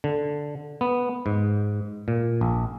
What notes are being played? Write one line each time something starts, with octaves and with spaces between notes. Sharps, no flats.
D3
B3
G#2
A#2
A#1